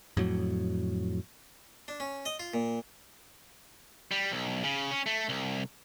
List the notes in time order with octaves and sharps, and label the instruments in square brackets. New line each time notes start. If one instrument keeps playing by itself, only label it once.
[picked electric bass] F2 A2 F#3
[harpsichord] D4
C#4
D#5
F4
A#2
[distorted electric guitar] G3
B1
C#3
C#4
A3
C2